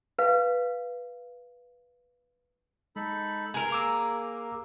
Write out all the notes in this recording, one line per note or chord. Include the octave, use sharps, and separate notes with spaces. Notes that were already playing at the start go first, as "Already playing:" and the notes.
B4 F5
G#3 D#4 A4 B5
G#4 A#4
A#3 A#5 D6 E6